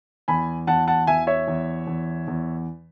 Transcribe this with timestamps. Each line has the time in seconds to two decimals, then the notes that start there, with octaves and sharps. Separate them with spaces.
0.28 E2 G#5 B5
0.67 E2 F#5 A5
0.87 F#5 A5
1.07 E2 E5 G#5
1.27 C#5 E5
1.48 E2
1.87 E2
2.28 E2